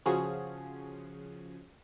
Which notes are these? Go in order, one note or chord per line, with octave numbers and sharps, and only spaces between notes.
C#3 F3 C#4 F#4 G#4